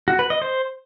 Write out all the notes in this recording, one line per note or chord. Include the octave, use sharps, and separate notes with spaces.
F#4
B4
D#5
C5